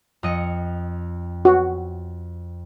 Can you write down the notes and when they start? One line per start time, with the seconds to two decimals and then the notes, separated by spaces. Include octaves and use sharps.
0.23 F2 D#5 C#7
1.45 F#4